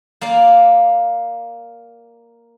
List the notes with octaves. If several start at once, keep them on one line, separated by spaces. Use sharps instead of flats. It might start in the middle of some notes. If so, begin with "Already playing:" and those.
A#3 D5 F5